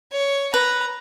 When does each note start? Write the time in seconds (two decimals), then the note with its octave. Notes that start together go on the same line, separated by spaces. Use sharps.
0.12 C#5
0.54 B4 A#5